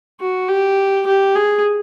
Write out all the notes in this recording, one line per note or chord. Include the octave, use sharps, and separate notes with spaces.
F#4
G4
G4
G#4